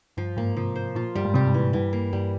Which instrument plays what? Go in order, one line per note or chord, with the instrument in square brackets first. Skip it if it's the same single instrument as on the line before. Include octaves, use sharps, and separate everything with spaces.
[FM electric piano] G2 [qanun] F3
[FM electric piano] G#2 [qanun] A#3
[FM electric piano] C3 [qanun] F3
[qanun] C5
[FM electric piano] A#2 [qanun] F4
[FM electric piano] G2 [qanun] G3
[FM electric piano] G#2
[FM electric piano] C3 [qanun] G3
[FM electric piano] G#2
[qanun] E3
[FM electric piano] A#2
[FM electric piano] G2 [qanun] E3
[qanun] A#3
[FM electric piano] G2 [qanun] G3